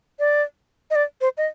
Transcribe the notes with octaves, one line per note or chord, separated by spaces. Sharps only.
D5
D#5
D5
C5
D#5